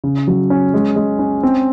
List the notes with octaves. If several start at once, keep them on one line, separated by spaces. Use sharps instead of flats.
C#3
F#3
C#4
G#3
G#3
C#4
C4